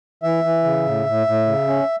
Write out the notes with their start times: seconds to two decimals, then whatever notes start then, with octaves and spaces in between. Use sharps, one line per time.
0.23 E3 E5
0.44 E3
0.64 C#3
0.85 A2
1.06 A2
1.27 A2
1.46 C#3
1.68 C#4